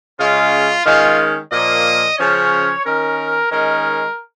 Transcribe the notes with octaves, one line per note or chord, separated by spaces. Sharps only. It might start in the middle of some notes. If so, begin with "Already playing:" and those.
C#3 G#3 C#4 F4
D#3 G#3 C#4 F4
A#2 F3 A#3 D#5
C#3 F3 C#4 C#5
D#3 C#4 A#4
D#3 G#3 C#4 A#4